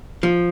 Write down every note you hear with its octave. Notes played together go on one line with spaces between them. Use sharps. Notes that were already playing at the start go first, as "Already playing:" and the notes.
F3